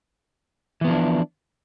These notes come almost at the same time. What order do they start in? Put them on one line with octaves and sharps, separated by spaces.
E3 B3 F3 D4